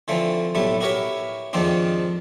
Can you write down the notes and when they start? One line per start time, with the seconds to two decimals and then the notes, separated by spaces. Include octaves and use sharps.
0.08 D3 E3 F3 A3 C4
0.55 B1 A2 G3 A3 E4
0.81 E4 F#4 G4 A#4 B4 C#5
1.53 F2 G#2 D#3 F3 C4 D4